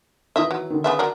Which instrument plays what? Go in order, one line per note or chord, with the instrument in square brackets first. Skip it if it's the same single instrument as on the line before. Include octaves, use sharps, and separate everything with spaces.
[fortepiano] D#3 E3 [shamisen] D#4 D#5 E5
[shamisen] F#3
[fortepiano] D3 D#3
[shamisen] C#3 B3 E5
F#3 D4 A#4